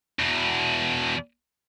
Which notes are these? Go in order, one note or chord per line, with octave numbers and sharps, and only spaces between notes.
E2 B2